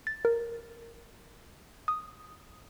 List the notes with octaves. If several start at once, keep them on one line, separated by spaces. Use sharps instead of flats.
A6
A#4
D#6